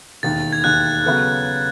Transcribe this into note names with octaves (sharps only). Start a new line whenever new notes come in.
E1 D#2 D#3 A6
G#6
E1 D#2 D#3 F#6
C#3 F#3 B3 F#4 A4